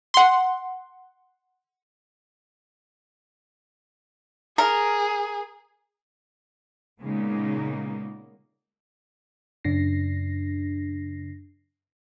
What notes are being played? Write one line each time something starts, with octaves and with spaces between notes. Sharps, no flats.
F#5 C6
G#4 A#4
A#2 C#3 G#3 A#3 B3 D#4
F#2 C#3 D4 A#6 C7